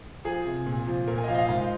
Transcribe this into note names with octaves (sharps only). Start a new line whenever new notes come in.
F3 G#4
C3
A#2
F3
A#2 A#4
G#5
D#5
F3 F5
D#5
F5
G#2 F5